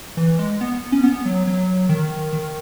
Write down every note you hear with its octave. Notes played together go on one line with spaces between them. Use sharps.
E3
G#3
B3
C#4
B3
F#3
F#3
D#3
D#3